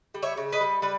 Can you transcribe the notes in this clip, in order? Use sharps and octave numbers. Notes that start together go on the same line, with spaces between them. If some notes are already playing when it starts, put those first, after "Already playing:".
G3
C#5 E5
C#3
B4 D#5
G3
G3 B4